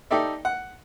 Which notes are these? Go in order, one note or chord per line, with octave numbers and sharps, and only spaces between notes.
D#4 G4 A4 D5 E5
F#5